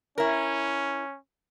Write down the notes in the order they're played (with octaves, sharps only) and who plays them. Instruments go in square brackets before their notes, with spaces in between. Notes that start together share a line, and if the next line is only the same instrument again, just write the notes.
[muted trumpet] C#4 [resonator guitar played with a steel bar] E4 A#4